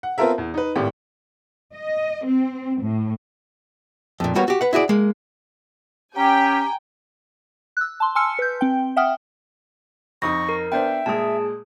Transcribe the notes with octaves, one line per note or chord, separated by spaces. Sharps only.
F#5
B3 C4 F4 A4 A#4 E5
E2
D#4 B4
G#1 A2 G4
D#5
C4
A2
F2 A#2
G3 A#3 B3 F#4 C#5
F#4 G4
B4 F#5
E4 F#4 G#4 D5
G#3 A#3
C#4 G4 G5 G#5 A#5
E6 F#6
A5 C6
G#5 A5 C6 E6 F6 C#7
B4 G6
C4 G5
E5 F#5 G5 D#6 F6
F2 D#4 C#6 D#6 A#6
A#4
B3 D4 C5 E5 G5
A#2 G#3 G#4 A5 D#6